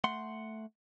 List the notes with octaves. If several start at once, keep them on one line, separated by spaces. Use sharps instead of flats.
A3 F#5 C6